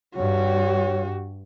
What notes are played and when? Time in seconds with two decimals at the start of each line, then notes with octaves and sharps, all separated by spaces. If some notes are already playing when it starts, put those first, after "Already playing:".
0.17 G2 F#4 G4 C#5